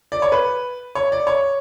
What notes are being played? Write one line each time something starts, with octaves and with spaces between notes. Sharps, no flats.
D5
C#5
B4
C#5
D5
C#5